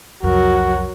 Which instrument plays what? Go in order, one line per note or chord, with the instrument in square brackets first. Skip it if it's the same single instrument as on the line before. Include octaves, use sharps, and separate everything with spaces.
[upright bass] C2 F2 [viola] F#3 A#4 [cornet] F#4